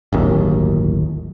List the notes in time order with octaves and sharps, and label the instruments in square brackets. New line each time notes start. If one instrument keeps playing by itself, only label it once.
[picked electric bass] D1 G1 D#2